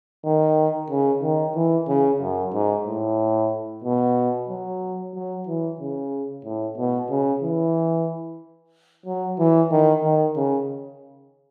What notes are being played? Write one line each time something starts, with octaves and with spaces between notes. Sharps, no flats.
D#3
C#3
D#3
E3
C#3
F#2
G#2
A2
B2
F#3
F#3
E3
C#3
A2
B2
C#3
E3
F#3
E3
D#3
D#3
C#3